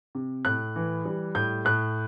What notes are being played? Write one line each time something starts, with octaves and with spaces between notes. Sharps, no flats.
C3
A2 F#6
E3
G3
A2 G6
A2 F#6